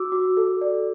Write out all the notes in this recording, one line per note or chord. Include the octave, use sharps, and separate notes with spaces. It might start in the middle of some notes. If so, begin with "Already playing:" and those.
Already playing: F#4 D6 E6
F#4
A4
D5